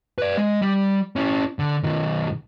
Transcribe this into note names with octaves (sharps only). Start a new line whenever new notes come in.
B4 D5
G#3
G3
C#4 E4
D3
B1 D#3